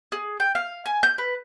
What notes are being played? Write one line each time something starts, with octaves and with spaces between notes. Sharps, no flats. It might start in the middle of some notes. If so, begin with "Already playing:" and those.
G#4
G5
F5
G#5
G6
B4